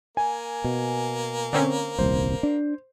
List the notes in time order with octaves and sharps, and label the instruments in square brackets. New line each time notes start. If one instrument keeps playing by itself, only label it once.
[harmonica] A#3 [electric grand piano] G#5
[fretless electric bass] B2
[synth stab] D3 C4 C#4
[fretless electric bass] D#1 C2 [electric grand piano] C5
[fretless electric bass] D4